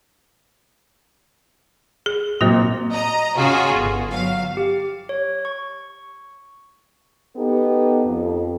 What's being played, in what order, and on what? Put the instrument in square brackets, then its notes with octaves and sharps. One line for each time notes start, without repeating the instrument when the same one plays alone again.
[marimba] G#4
[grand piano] A#2 C4 [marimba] F#3 A#3 F#4
[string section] D#5 A#5
C#3 F4 F#4 G#4
G1
F#3 F5
[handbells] G4
C#5
C#6
[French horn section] B3 D#4 G4 A4
F2